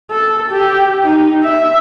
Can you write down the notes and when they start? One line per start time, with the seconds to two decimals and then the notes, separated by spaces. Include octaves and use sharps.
0.11 A4
0.52 G4
1.03 D#4
1.43 E5